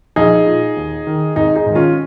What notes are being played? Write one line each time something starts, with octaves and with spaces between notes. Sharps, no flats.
A#1 D#4 G#4
A#2
D#2
D#3
G#1 D#4 G#4
D#4 G#4
G#2 D#3
C#4 F4